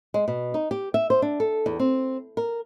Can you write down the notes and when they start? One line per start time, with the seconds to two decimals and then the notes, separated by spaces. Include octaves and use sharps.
0.14 G#3
0.28 B2
0.54 D#4
0.71 G4
0.94 E5
1.10 C5
1.22 D4
1.40 A4
1.66 E2
1.79 C4
2.37 A#4